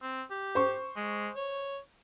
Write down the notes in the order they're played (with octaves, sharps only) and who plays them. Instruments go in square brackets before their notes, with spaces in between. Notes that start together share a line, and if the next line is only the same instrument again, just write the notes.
[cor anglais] C4
G4
[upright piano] C5 C#6
[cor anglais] G#3
C#5